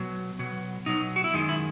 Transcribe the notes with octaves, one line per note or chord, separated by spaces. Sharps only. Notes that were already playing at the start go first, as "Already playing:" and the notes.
Already playing: B2 F#3
B2 F#3
B2 F#3 D#4
F#4
E4
F#2 D#3 G#3 D#4
E4